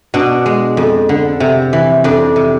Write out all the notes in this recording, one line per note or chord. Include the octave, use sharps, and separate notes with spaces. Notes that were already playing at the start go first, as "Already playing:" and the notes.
B2 D4
G#3
F2
D3
C3
E3
F2 D4
C3